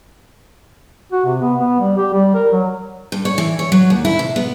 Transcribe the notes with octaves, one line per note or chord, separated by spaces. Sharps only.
F#4
C3
B3
B3
G3
G4
G3
A#4
F#3
G2
C#5
E3
C#5
F#3
D#2
E4
C3
B3